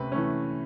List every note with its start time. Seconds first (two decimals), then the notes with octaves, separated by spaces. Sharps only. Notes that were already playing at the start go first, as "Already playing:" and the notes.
Already playing: C3 A3 C#4 B4
0.12 E3 A3 C#4